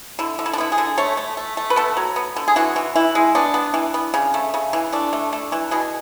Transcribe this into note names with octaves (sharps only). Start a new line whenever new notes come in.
D3 E4
D3
E4
D4
B3 E4
G#4
D3
A3 C#5
A3
A3
A3
B4
B3 A4
F#3
B3
D3
G#4
E3 F#4
E3
E3 E4
G#3
B3 D4
B3
E3
B3
C#3
A3
C#3
E3
A3 D4
A3
A3
E3
B2 G#4